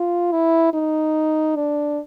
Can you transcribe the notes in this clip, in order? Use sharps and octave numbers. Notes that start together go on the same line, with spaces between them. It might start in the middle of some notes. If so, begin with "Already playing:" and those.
Already playing: F4
E4
D#4
D4